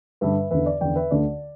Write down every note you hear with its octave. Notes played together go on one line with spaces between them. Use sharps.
G2 D3 B4 E5
E2 D3 B4 E5
D5
E2 D3 D5 G5
B4 E5
D2 D3 D5